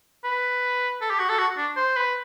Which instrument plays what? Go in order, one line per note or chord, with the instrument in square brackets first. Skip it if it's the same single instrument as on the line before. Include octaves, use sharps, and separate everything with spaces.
[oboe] B4
A4
G4
F#4
A4
F#4
D4
C5
B4